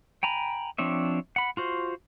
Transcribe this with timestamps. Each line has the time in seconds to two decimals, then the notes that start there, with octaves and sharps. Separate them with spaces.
0.23 G5 G#5 A#5 B5
0.78 F3 C4 D4 C#5 E5
1.36 F#5 B5
1.57 F4 F#4 C5